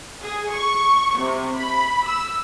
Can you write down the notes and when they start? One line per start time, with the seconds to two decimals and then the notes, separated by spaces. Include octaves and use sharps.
0.22 G#4
0.51 C#6
1.17 C3
1.56 B5
2.06 E6